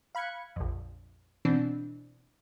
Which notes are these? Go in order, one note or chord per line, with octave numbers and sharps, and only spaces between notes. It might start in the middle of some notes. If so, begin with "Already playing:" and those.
F5 B5 F#6 G#6 C#7
A#1 F2
B2 E3 C4 D4